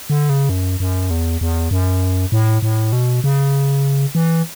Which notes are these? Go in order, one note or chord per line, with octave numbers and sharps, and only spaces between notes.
D3
C#3
F#2
F#2
E2
E2
F#2
A2
A2
B2
C#3
E3